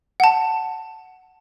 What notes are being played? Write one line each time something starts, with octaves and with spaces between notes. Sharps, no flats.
F#5 A5